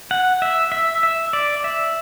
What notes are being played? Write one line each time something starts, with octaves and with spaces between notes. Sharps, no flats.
F#5
E5
E5
E5
D5
E5